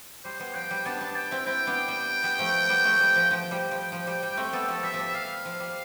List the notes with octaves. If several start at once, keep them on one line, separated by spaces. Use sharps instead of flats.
G3 C5
G3 B3
F3 G5
G3
B3 D4 A5
B3 D4
G5
C4 E4
C4 E4 G5
B3 D4
G3
G3 B3
F3 A3
G3 B3
F3 A3
G3
F3
F3 G5
G3
F3
F3
G3
G3
A3 C4
G3 B3 A4
F3 A3
G3 E5
F3
G3
G3 F5
F3
G3